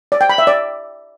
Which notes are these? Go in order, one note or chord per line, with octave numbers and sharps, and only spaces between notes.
D5
G5
B5
E5
D5